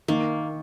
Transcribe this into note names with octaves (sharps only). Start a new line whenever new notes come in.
D#3 A#3